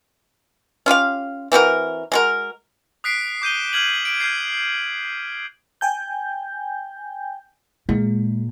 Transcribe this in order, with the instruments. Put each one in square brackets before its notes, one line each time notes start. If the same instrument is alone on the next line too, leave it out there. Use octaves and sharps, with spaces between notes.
[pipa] C#4 F4 G4 F5
E3 C4 F#4 A#4
G#3 F#4 A#4
[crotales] D#6 F#6 B6 C7 D7
D6 G6 D#7 G7
F6 G#6 F#7
D7
F6 G6 G#6 C7
[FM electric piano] G5 G#5 G6
[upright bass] A#2 [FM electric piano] G#3